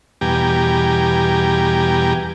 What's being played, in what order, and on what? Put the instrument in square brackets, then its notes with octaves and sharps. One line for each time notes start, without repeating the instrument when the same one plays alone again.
[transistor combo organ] E2 B2 G3 G4 G#5 A#5